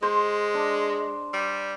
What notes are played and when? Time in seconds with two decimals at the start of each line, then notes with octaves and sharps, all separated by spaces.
0.02 G#3 C5
0.54 D4
1.34 G3